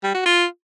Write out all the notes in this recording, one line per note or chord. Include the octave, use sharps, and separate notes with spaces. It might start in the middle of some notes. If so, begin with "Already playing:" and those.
G3
F#4
F4